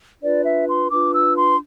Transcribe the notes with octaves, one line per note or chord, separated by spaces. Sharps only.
D4 F4 B4 D5
E5
C6
D4 F4 B4 D6
E6
C6